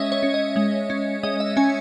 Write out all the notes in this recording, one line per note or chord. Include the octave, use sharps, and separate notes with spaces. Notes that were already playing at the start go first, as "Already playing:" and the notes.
Already playing: G#3 C#4 C#5 D#5 E5
C#5
C#4
D#5
G#3
C#4
G#3 D#5
E5
C#4 G#5